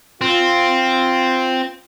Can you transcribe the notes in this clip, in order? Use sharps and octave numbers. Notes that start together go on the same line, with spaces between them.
C4 F4